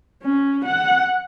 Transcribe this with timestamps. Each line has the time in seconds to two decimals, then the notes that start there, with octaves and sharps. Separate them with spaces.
0.23 C#4
0.65 F#5